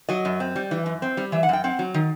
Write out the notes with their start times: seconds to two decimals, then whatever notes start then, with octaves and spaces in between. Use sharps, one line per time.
0.09 F#3 D#5
0.25 F#2
0.40 C4
0.56 G3
0.71 E3
0.86 F#2
1.02 C4
1.17 G3
1.32 E3 E5
1.43 F#5
1.49 F#2 G5
1.64 C4 F#5
1.79 F#3
1.94 D#3